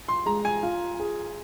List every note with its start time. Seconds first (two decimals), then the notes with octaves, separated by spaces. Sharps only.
0.08 C6
0.26 G#3 A#5
0.45 G#5
0.63 F4
0.99 G#4